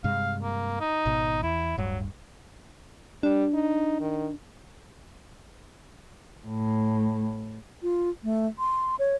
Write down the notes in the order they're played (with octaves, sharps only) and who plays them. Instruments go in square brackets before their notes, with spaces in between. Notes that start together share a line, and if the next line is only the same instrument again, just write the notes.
[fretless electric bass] G2 C3 G#3 [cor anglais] F5
[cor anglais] A#3
D#4
[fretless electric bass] G#1 B2
[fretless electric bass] E2 [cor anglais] E4
[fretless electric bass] D1 G2 [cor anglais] F#3
[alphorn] G3 [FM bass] D4
[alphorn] D#4
D#3
[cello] A2
[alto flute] F4
A3
C6
C#5